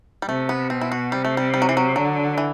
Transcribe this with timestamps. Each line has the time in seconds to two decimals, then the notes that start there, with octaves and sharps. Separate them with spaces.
0.22 G3
0.28 C3 A3
0.49 B3
0.70 B2 C4
0.81 E4
0.92 F#4
1.12 C3 G3
1.25 A3
1.37 G3
1.54 G3
1.62 F#3
1.69 E3
1.77 F#3
1.96 D3 F#3
2.38 E3